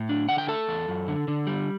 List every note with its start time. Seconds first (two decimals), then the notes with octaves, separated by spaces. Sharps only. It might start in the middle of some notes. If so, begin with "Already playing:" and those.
Already playing: A2
0.09 D4
0.29 D3 F#5
0.38 G5
0.48 A3 A4 A5
0.68 E2
0.88 F#2
1.08 D3
1.28 D3
1.47 G3